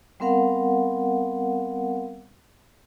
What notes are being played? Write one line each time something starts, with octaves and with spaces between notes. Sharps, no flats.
G3 B3 C4 A#4 F5 F#5